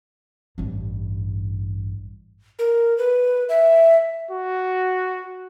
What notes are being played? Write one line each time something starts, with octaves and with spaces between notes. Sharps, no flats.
A1 G2
A#4
B4
E5
F#4